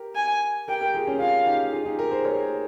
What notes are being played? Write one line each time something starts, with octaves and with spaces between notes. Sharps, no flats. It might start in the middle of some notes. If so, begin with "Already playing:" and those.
Already playing: G4 A#4
G#5
G4 A#4 G5
G4 A#4
F4 G#4
C#4 F4
C#4 F4 F5
D#4 G4
F4 G#4
D#4 G4
G4 A#4
G#4 C5
A#4 C#5